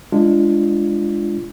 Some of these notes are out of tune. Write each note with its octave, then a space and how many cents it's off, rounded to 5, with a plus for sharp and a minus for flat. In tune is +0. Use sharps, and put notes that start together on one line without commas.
G#3 +0 D4 +5 F4 -25